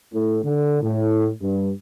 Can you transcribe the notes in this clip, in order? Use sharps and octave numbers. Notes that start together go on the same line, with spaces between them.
A2
D3
A2
G2